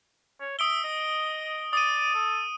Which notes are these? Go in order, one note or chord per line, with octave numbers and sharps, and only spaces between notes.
C#5
E5 D#6 D7 G7
D#5
D5 D#6 D#7
A4